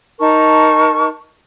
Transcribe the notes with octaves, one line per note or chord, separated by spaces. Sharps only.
D#4 A#4 A5 C#6